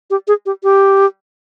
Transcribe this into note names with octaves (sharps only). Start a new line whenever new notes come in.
G4
G#4
G4
G4